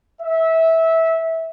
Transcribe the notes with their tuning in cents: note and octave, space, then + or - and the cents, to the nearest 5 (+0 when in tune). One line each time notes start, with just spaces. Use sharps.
E5 -20